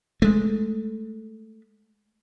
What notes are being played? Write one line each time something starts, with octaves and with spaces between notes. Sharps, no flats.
G#3 A3